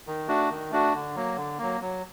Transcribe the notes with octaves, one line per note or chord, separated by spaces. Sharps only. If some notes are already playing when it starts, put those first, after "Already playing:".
D#3
A3 D4 F#4
D#3
A3 D4 F#4
D3
F#3 A#3
D3
F#3 A#3
F#3